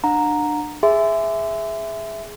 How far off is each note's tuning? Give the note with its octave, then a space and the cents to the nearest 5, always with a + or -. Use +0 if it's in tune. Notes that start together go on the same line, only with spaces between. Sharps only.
D4 +20 F#5 -35 A#5 +0
G#4 +0 E5 +0 C6 -35